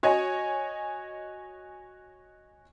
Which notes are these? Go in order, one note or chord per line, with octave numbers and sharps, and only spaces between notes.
F#4 C#5 D#5 G#5